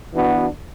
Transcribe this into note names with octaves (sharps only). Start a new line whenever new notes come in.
E3 B3 D4 F#4